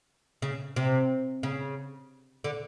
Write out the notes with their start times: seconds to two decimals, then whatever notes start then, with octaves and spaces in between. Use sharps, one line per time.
0.42 C#3
0.76 C3
1.43 C#3
2.44 D3